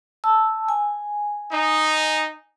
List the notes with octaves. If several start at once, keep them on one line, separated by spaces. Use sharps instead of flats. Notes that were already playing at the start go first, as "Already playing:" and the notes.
A5 E6
G#5
D#4